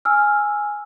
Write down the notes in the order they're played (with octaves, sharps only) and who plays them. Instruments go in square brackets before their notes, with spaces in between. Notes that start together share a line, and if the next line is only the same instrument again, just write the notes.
[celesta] G#5 E6 F6